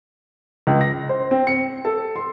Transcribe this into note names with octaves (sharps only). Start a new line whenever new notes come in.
C#2
A#6
C5
C4
C#7
A4
C6